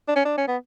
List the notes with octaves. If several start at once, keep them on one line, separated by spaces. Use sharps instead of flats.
D4
C#4
D4
C#4
B3